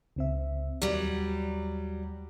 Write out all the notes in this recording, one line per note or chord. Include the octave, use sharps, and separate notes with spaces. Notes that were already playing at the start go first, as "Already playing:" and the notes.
C#2 C4 E5
D#2 F#3 G3